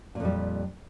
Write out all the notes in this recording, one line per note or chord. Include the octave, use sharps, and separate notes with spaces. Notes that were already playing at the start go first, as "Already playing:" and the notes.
F2 A#2 G3